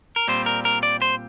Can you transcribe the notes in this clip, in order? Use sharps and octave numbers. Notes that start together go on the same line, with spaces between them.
A#4
A#2 G3 C4 C5
A#4
A#4
D5
C5